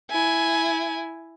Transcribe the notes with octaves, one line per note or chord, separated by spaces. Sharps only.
E4 G#5